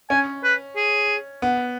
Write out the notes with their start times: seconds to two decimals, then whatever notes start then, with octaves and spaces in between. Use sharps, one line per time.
0.10 C#4 G#5
0.44 B4
0.76 G#4
1.42 B3